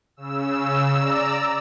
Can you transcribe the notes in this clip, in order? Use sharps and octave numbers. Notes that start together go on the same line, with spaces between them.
C#3 E6
D5 A#5 E6